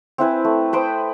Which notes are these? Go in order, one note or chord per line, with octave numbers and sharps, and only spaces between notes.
C4 E4 B4 G#5
A3
B4 C5 G5 D#6